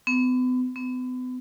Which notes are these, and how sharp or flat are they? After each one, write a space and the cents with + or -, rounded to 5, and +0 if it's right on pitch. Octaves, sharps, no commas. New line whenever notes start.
B3 +40
B3 +40